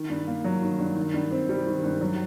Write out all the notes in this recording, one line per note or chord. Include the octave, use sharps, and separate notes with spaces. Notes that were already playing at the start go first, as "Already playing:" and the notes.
Already playing: D#3
G2
A#3
F#3
D#3
G2
D#3
G2
C4
G3
D#3
G2
F#3